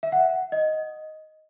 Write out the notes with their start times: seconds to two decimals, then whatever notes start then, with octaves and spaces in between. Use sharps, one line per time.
0.03 E5
0.12 F#5
0.52 D#5